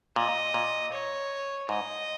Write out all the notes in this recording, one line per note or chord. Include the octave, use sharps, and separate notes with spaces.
A#2 D#5
A#2
C#5
G#2 D#5